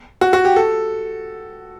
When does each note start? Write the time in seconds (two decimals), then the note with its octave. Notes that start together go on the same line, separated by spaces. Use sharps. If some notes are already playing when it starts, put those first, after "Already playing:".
0.21 F#4
0.33 F#4
0.45 G4
0.56 A4